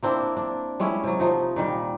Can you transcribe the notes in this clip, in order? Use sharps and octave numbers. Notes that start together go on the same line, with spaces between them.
A#3 C4 D4 E4
D4
G3 G#3 C#4 E4
C3 F#3
F3 D#4
A#2 D#3 G3